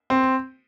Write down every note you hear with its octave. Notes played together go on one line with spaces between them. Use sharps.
C4